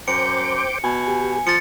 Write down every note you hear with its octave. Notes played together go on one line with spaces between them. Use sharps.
F#2 C5 G5 D6 C#7
B2 G#5
G4
F3 A6 C#7